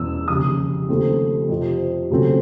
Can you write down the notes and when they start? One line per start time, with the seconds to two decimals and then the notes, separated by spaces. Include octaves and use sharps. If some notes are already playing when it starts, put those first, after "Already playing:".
Already playing: E1 E2 B2 D#6 E6
0.28 F1 D#2 C#3 D#6
0.89 D#2 C#3 F3 A3 C4
1.49 F2 C3 F3
2.11 D#2 C#3 F#3 A3 C4